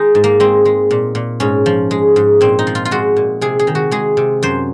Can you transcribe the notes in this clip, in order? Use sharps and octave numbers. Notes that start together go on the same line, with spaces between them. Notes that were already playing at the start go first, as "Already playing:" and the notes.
Already playing: D#3 G#3 D#4
G#2
A#3
G#3 C4
G#3
A#2
A#2
G#2 C#4
F3
G#3
G#2
A#2 C4
D#4
F3
F4
F4
G#3 F#4
A#2
C3 G#4
G#4
D#3
F#4
G#3 G#4
C3
F#2 C5